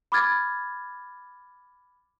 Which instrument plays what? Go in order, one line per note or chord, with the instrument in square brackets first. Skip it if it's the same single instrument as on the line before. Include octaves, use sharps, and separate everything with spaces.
[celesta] B5 D6 F6 G#6 A6